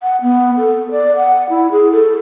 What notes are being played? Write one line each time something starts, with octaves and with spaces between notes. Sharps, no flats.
F#5
B3
A4
D5
F#5
E4
G#4
A4